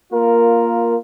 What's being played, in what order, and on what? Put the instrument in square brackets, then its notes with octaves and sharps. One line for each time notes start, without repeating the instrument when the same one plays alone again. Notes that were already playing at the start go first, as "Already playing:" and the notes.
[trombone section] A#3 F4 A#4